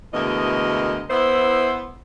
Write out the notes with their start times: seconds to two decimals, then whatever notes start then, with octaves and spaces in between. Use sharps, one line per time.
0.13 D2 B2 E3 G#3 A#4 D#5
1.10 B3 E4 C5